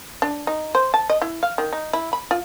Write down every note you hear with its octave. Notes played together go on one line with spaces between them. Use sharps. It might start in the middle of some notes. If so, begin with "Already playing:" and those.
D4
D#4
C5
A5
D#5
E4
F5
D#3
D#4
E4
B5
F4